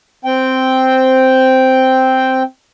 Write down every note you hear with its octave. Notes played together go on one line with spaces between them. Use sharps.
C4 G5